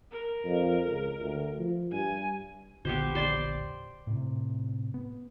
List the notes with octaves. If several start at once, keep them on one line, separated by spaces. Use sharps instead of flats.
A#4
F2
C#2
D2
F3
G2 G#5
E1 A#1 D3 B3 G4 C5
C5 D5 C6
A2 C3
B3